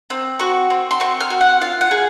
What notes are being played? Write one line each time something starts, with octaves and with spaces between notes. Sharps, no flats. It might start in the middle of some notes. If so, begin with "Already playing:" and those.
C4
F#4 C#6
C4
C6
C4 C#6
F6
F#4
F#5
F4 F5
F#5
G#4